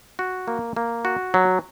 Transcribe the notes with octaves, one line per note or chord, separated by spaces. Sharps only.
F#4
A#3
A#3
F#4
F#3